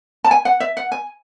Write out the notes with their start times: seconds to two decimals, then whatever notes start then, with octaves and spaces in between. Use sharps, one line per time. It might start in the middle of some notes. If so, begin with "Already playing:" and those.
0.24 A5
0.31 G#5
0.45 F#5
0.60 E5
0.77 F#5
0.92 G#5